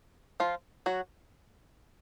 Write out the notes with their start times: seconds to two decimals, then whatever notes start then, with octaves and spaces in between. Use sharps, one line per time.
0.40 F3 F4
0.86 F#3 F#4